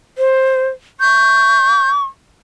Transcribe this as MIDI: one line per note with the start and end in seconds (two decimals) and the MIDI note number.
0.18 0.68 72
1.00 2.03 85
1.00 1.90 91